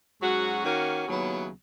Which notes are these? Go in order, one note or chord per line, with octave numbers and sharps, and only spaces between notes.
G#2 F#3 C#4 F#4
D#3 A#3 C#4 F#4
D#2 C#3 F#3 B3 E4